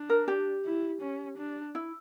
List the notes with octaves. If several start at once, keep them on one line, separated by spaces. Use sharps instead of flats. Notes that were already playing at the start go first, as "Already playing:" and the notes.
Already playing: D4
A#4
G4
E4
C#4
D4
E4